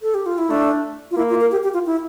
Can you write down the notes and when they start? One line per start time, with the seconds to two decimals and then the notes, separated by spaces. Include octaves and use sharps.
0.01 A4
0.14 G4
0.26 F4
0.38 E4
0.49 A3 D4
1.11 F4
1.17 A#3 E4
1.29 F4
1.40 A#4
1.51 G4
1.63 G4
1.74 F4
1.86 E4